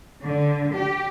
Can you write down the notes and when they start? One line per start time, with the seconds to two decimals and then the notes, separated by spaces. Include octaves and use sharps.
0.24 D3
0.77 G4